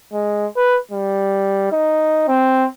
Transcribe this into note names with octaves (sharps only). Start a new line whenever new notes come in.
G#3
B4
G3
D#4
C4